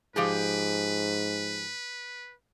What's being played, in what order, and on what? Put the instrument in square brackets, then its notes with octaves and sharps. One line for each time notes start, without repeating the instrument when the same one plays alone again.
[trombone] G#2 [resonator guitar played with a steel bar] F3 G4 G#4 [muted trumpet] B4